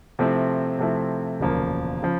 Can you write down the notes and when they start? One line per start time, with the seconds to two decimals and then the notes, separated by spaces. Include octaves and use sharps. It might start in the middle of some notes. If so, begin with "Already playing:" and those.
0.19 C3 F3 A3 C4 E4
0.79 C3 F3 A3 C4 E4
1.40 E1 D2 C#3 F3 A#3
2.03 C#3 F3